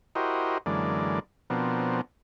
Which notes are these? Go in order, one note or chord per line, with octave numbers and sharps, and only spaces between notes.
E4 F#4 G4 A#4 C5 D#5
F#2 D3 E3 G#3 A#3 D5
B2 F3 B3 C4 D4 A#4